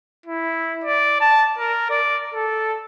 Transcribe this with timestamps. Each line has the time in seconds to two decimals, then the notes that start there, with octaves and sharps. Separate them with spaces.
0.26 E4
0.84 D5
1.21 A5
1.58 A#4
1.90 D5
2.34 A4